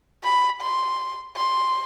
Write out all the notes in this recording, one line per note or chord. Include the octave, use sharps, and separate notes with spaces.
B5
C6
C6